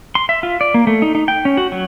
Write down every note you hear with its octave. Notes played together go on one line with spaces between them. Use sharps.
C6
E5
F4
D5
A#3
A3
D#4
D#4
G5
C#4
F#4
F#3